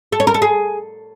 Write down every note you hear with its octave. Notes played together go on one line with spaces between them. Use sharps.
A4
C#5
A#4
A4
G#4